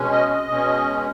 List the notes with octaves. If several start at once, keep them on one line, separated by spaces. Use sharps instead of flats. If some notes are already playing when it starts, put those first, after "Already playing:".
Already playing: B2 G#3 C#4
D#5
D#5
B2 G#3 C#4